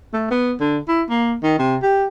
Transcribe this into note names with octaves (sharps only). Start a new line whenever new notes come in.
A3
B3
D3
E4
A#3
D#3
C3
G4